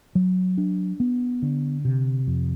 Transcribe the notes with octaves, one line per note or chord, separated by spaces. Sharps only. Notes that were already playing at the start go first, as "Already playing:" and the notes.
F#3
D4
B3
D3
C3
F2